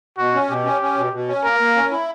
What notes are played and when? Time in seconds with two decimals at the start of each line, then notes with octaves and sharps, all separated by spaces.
0.18 B2 F#4
0.34 C#4
0.49 B2 G4
0.65 C#4
0.82 C#4
0.97 B2
1.13 B2
1.28 C#4
1.44 A#3 A#4
1.60 A#3
1.76 C#4
1.91 E4